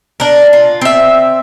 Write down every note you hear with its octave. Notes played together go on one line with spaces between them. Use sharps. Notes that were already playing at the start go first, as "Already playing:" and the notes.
D4 A#4
F4
C4 E5